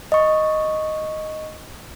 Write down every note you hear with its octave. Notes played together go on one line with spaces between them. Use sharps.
D#5 C#6